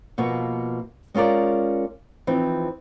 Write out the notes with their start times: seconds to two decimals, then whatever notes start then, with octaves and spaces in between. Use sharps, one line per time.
0.18 B2 F3 A#3 B3 F#4 E5
1.14 G#3 C#4 F4 A#4 D5
2.27 E3 F3 C4 D#4